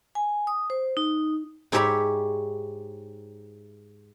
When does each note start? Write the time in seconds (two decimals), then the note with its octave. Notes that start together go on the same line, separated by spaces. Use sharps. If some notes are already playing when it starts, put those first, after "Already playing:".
0.15 G#5
0.47 D#6
0.70 C5
0.97 D#4
1.72 G#2 E4 G4 C#5 E5 B5